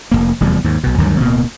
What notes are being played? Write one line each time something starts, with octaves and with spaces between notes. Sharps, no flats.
F1 E2 A#3
F1 E2 G3
D#2 G#2
B1 B2
D2 G2 D#3 F#3
D1 B2 A#3